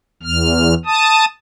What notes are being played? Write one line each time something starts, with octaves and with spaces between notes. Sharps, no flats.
E2 F6
A5 D#6